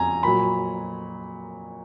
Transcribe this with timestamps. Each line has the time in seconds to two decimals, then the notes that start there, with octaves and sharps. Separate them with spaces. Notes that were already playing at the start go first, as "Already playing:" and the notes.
Already playing: F2 G#5 A#5
0.23 A#2 F#3 B5